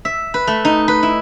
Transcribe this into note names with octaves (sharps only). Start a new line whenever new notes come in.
E5
B4
A3
D#4
B4
E4